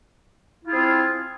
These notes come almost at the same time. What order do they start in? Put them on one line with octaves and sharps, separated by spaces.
E4 F4 G#4 C4